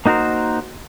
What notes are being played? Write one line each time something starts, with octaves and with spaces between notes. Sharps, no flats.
A#3 D#4 F#4 A#4 C5